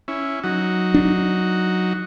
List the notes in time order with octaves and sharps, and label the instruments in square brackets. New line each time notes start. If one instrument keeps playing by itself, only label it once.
[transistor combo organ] C#4 E4
F#3 D#4 F#4
[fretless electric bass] D4